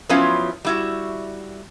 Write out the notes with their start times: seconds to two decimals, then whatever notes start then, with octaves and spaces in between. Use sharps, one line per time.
0.09 F3 F#3 B3 C#4 E4 F4
0.65 G3 E4 F#4